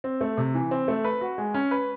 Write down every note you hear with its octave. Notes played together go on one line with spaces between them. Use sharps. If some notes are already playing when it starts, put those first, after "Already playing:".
C4
A3
C3
E3
C4
A3
B4
F#4
G#3
C#4
B4